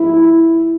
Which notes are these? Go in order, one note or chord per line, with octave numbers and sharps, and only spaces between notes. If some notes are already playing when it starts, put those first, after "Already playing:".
Already playing: G#2 F3 A#3 E4